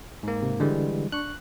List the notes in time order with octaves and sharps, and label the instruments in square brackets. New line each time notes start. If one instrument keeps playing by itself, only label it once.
[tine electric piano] G#2 A#3
[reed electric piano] C3
[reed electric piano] D3 [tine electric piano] E3 G3 G#3
[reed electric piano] D4 C#6 [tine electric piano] F#6